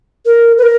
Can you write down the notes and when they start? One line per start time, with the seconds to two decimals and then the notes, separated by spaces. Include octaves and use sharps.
0.26 A#4
0.58 B4
0.63 A#4